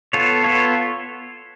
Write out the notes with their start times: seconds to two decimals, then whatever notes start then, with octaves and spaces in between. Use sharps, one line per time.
0.13 B3 F4 A4 C#5
0.44 B3 F4 A4 C#5